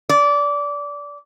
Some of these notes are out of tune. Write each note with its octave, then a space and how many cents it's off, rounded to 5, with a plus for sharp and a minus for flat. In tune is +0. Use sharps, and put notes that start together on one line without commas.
D5 -20